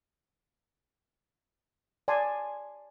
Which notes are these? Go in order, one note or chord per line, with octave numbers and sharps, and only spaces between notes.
D5 G#5 A5 C6